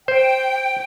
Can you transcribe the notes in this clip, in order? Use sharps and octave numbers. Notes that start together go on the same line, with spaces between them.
C5 G5